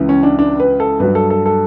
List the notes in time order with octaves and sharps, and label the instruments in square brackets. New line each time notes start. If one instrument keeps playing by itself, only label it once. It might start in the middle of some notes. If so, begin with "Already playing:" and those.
Already playing: [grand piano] C#2 C#3 E3
C#4
D4
D4
B4
A4
G2 F#3 B4
A4
A4
A4